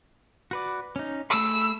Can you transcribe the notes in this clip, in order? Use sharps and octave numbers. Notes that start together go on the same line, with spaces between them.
F#4 B4 D5
C#4 D#4
A3 G#4 B5 E6